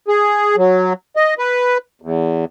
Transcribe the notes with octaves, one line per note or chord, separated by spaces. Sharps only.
G#4
F#3
D#5
B4
E2